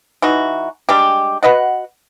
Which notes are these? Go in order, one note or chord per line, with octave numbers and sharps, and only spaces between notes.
E3 D#4 F#4
G3 G#3 D4 G4
F#4 B4 D#5 F#5